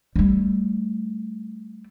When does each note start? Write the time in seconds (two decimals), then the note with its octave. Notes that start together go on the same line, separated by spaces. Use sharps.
0.16 G3 A3